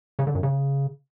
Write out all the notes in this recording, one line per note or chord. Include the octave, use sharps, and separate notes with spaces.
C#3
D3
F#2
C#3